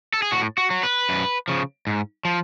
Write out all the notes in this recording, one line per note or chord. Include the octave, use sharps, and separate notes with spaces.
A4
G#4
A2 F#4
F#4
F#3
B4
F#2
C#3 F3
G#2
F3